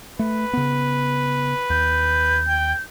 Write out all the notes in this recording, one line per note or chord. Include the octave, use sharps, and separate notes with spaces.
A3 B4
C#3 B3
D#2 G6
G5